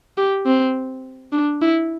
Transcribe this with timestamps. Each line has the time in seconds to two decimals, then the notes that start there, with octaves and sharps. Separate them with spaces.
0.18 G4
0.46 C4
1.32 D4
1.62 E4